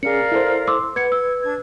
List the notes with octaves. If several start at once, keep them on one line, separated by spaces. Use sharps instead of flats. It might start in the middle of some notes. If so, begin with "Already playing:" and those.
C#4 G#4 A#4 D5 F5 C#7
E4 A4 C5
C6 D6 E6
B4 F#5 G#6 C#7
E6 G#6
D4 G#6